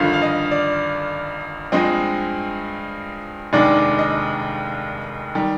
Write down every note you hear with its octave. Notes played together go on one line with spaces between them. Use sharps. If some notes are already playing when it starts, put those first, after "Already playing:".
Already playing: G#1 G2 D3 F3 F5
F5
D#5
D5
G2 F3 G#3 C4 D#5
F1 D#2 D#3 G#3 D4 D5
D#5
D#3 G3